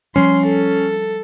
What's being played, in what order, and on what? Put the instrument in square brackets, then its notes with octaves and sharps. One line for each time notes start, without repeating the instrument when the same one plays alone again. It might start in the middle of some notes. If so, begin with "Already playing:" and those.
[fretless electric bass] F3 G3 [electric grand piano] C#4 C7 [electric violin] C6
[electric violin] A4